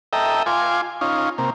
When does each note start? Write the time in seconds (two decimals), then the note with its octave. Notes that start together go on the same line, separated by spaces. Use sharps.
0.13 A4 D#5 E5 G5 A#5
0.46 F4 G#5 C6 D6
1.01 C#4 D#4 F4
1.38 C3 A#3